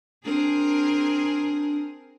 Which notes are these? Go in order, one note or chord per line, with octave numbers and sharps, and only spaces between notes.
C4 D4 G#4 A#4